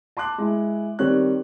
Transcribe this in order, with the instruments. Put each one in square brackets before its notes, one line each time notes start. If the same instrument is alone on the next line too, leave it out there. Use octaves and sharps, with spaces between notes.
[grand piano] A5 C6 D6 F#6
G#3 E4
D#3 G3 C4 C#5 F#6